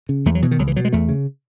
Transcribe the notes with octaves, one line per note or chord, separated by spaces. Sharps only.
C#3
E2 A3
F#3
B2 E3
D#3
C#2 F#3
E3
B2 F#3
G#3
E2 A3
C#3